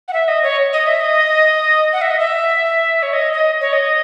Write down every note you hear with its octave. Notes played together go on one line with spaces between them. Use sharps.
F#5
E5
D#5
C#5
D#5
E5
D#5
F#5
E5
D#5
E5
C#5
D#5
D#5
C#5
D#5